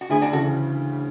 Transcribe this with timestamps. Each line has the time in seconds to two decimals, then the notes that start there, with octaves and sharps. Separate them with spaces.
0.01 F#4
0.09 D2 E4 G#4
0.21 D4 F#4
0.33 C#3 E3 F#4 A4